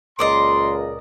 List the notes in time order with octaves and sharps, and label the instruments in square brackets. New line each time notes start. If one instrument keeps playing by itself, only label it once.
[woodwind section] C#2 A#2 [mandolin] A#4 D5 D#5 [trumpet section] C6